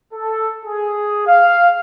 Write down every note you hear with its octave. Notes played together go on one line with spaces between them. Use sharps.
A4
G#4
F5